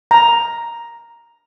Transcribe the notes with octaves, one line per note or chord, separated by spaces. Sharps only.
A#5